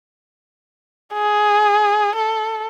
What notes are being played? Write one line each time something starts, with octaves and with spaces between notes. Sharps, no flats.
G#4
A4